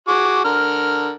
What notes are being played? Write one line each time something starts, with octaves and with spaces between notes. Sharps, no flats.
F#4 G#4 D6
D3 A#4 F6